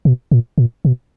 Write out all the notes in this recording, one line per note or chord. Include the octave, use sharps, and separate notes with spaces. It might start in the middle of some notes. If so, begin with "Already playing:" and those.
B2
A#2
A#2
B2